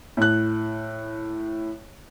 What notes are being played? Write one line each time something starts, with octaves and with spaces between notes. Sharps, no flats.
A2 F#6